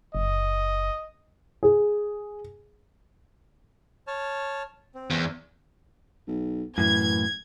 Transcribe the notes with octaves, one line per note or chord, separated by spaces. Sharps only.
F#1 D#5
G#4
C#5 A5 F6
C4
E2
B1
F#2 A2 E3 G#6